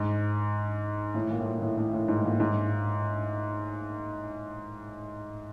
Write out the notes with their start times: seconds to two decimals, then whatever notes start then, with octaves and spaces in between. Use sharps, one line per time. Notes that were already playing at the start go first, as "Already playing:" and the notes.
Already playing: G#2
1.14 A2
1.30 A#2
1.40 A2
1.46 A#2
1.62 A2
1.77 A2
1.93 A2
2.08 G#2
2.19 A2
2.24 A#2
2.40 G#2